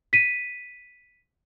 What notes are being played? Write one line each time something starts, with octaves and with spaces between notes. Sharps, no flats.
B6 D#7